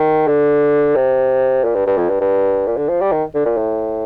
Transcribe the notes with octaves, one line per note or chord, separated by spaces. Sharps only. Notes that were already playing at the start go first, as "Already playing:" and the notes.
Already playing: D#3
D3
C3
A#2
G2
G2
F2
G2
G2
A#2
D3
F3
G3
D#3
D3
A#2
A2